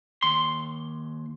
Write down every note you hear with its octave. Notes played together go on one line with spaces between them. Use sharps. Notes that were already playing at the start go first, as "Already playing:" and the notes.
D#2 C6